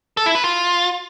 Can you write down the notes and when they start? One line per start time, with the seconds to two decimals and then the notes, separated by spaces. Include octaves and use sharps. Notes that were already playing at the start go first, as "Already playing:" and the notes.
0.17 A4
0.26 E4
0.35 B4
0.44 F4